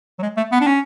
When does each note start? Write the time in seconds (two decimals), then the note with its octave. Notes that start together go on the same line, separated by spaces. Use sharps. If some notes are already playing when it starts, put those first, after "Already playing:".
0.19 F#3
0.22 G#3
0.37 A3
0.52 B3
0.61 D4
0.67 C#4